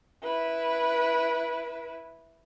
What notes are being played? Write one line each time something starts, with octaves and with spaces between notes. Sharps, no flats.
E4 B4